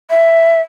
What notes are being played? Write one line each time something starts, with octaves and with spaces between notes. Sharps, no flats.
E5